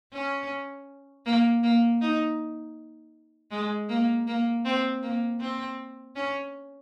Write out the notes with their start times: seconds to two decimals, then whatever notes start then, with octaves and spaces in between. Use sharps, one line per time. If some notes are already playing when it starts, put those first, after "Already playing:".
0.13 C#4
1.26 A#3
1.63 A#3
2.01 D#4
3.51 G#3
3.89 A#3
4.27 A#3
4.65 C4
5.03 A#3
5.41 C4
6.16 C#4